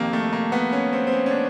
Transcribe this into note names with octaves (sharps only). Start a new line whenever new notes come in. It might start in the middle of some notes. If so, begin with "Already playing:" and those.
Already playing: F2 C3 D#3 A#3
A3
A#3
B3
C#4
C4
C4
C#4
C#4
D4